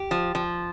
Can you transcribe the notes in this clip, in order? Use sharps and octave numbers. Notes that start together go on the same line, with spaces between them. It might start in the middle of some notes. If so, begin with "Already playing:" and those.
Already playing: G4
F3
F3